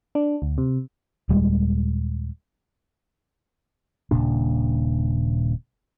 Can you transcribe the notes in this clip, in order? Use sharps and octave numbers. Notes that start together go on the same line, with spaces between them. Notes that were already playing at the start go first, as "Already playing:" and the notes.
D4
D2
C3
D#1 G3 G#3
D#1 A#2 C#3 D4